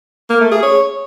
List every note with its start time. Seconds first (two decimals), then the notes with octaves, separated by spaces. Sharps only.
0.30 A#3
0.41 A3
0.52 G#4
0.63 C#5